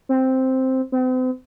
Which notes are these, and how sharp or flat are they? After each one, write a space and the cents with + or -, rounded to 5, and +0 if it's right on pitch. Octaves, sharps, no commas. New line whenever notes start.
C4 +0
C4 -40